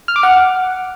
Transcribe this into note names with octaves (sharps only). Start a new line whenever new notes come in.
F6
D6
F#5